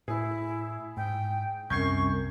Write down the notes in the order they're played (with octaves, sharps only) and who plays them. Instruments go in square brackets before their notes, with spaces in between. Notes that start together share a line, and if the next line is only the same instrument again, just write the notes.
[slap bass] A2 [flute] E4 [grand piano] G#4
[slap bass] G#2 [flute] G5
[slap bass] C2 [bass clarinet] F#2 [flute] C#6 [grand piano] G6 G#6 C7